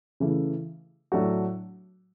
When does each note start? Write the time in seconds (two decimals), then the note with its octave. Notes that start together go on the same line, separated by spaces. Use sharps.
0.20 C#3 E3 A3
1.12 A2 F#3 A3 D4 F#4